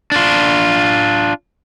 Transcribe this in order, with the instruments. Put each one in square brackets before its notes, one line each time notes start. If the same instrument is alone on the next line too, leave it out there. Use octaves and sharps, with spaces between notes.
[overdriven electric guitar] D4 F4